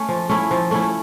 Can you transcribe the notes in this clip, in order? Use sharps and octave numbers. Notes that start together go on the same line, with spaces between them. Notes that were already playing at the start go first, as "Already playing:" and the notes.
Already playing: A3 C#4
F3
A3 C#4 E4
F3
A3 C#4 E4